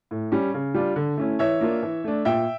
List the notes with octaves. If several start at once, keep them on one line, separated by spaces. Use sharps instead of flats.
A2
G3 C#4
C#3
G3 D4 F4
D3
A3 C#4 E4
E3 C#5 E5
A#3 D4 F4
E3
A3 D4
A#2 E5 G5